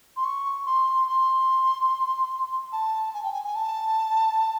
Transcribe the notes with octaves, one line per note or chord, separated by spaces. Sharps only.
C6
C#6
C6
C6
A5
G#5
G5
G#5
G#5
A5